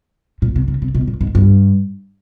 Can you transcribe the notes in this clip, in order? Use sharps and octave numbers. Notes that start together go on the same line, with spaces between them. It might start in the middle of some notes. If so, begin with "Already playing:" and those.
A#2
C3
C#3
C3
B2
A#2
G#2
G2